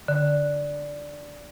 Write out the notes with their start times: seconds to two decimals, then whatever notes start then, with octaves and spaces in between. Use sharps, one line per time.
0.08 D3